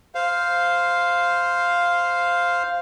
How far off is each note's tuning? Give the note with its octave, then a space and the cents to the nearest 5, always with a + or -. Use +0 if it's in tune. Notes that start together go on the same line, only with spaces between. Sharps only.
C5 -5 F5 +0